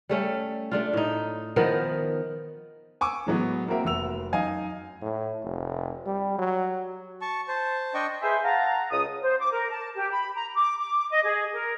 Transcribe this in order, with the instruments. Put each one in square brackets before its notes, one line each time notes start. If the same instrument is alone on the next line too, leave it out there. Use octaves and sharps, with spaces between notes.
[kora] G3 A3 C#4
A3 D4 F4
A2 D#4
D#3 F3 B3 A#4
[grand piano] G#5 C#6 D6 E6
A2 E3 F#3 G#3 B3
A#3 C4 F#4 A#4 E5
F1 F#4 E6 F7
F#2 D#4 D#5 F5 G#5 G#6
[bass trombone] A2
F1
G3
F#3
[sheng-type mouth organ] A5 C#6
C5 A5
D4 D#5 G5 C#6
[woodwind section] G#4 B4 C5 E5
F5 F#5 A5 A#5
C#2 D#6
[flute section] C5
D6
A#4
A5
G4
B5
A#5
D6
D6
D#5
G#4
A#4